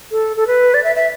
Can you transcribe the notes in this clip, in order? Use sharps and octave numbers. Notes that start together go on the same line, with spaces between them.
A4
A4
B4
D5
E5
E5